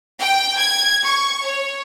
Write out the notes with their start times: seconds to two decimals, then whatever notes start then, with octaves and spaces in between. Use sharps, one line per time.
0.21 G5
0.58 G#6
1.04 C#6
1.44 C#5